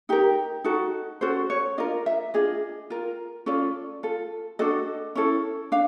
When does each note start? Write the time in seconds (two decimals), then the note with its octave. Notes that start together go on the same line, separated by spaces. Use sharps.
0.09 D#4 G4 A#4
0.64 D#4 F#4 A4
1.21 C#4 F#4 A4 C5
1.50 C#5
1.78 D4 F4 A#4 D#5
2.06 E5
2.34 D4 F4 G#4 D#5
2.90 F4 A#4
3.46 C#4 F4 A4 D5
4.03 F4 A4
4.59 D4 F#4 A4 D#5
5.15 C#4 E4 A4
5.72 D4 F5